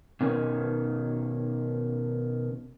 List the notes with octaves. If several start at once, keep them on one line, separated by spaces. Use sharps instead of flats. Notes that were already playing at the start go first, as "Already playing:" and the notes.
B2 D#3 C#4